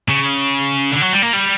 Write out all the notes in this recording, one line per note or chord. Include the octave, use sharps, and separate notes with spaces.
C#3
D3
F#3
G3
A#3
G3